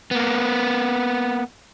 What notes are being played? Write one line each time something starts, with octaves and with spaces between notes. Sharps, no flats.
A#3 B3